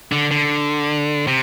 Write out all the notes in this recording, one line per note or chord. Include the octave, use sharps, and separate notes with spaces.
D3
D3
C3